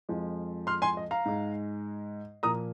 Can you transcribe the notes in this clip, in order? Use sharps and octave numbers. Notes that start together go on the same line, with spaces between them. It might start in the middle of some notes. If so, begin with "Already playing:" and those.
F2 F3 G#3
C6 F6
G#5 C6
D#5
F5 A#5
G#2 G#3
A#2 F3 A#3 A#5 D#6